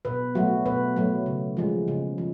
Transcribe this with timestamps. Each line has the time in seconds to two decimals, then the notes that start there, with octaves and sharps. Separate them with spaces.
0.05 B2 B4
0.35 F#3 A3 F#4
0.66 B2 B4
0.96 F#3 A3
1.26 C#3
1.57 F3 G#3
1.88 C#3
2.18 F3